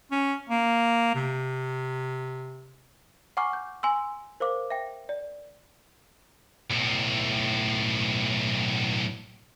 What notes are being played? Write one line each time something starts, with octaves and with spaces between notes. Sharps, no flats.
C#4
A#3
C3
F#5 G#5 A#5 C#6 D6 F6
G6
G#5 C6 E6
A#4 C5 F5 D6
E5 G5
D5
B1 A2